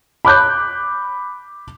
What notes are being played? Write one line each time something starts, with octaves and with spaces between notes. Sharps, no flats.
B5 D6 F#6 G6